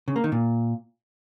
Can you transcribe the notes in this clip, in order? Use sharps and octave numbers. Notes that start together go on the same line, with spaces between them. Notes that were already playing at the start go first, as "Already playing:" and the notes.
C#3
A#3
D#3
A#2